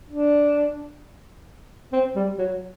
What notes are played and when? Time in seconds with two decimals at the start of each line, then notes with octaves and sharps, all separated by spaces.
0.10 D4
1.93 C4
2.16 G3
2.38 F#3